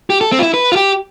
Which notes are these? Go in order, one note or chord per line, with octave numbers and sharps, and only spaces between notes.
G4
A4
C4
F4
E4
B4
F4
G4